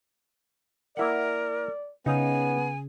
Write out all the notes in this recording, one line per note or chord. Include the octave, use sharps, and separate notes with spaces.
A#3 E4 A#4 D5 F#5
C#3 B3 D#4 C#5 F5 G#5